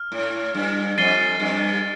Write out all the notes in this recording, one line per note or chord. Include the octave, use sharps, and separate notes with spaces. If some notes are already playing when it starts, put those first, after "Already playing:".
Already playing: F6
A2
G2
F2 A6 C7 D#7 G7
G2